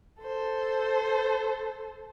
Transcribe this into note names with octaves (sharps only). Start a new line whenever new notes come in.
A4 C5